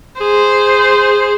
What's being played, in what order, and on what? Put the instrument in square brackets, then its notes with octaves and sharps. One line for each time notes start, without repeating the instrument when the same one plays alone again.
[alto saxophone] G#4 [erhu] C5